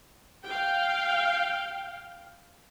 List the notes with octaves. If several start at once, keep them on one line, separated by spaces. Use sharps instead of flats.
F5 G5